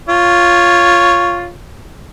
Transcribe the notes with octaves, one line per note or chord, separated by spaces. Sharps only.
F4 C#5